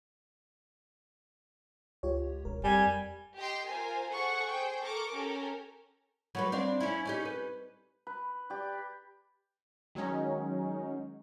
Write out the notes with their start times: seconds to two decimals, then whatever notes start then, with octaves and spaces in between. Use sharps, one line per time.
2.03 C#2 F4 G4 C#5
2.45 E1 A#4
2.64 F2 G3 G#5
3.38 G4 D#5 G5 C6
3.68 F4 A#4 C5 G#5
4.11 G#4 A4 C5 F#5 C#6
4.49 G#4 C5 G5
4.83 A4 A#4 C#6 D6
5.14 C#4 G4 A4 A#4
6.35 F#3 G3 B4
6.52 C4 D4 F5
6.80 C#4 E4
7.05 C#4 D#4 G4
7.25 B4
8.07 B4
8.50 G4 D5
9.95 D#3 F#3 G#3 C#4 D#4